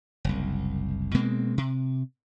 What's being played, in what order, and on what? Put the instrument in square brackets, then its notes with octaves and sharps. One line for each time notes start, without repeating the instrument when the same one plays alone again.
[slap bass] F#1 C2
B2 G#3 A#3 C4
C3